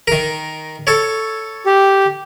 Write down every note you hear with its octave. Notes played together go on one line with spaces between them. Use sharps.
D#3 A#4
A4 C#5
G4